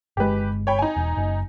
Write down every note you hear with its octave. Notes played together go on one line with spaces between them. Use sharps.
G1 G#3 G4 B4
C#5 G5 B5
D#4 G#5
E1
F#1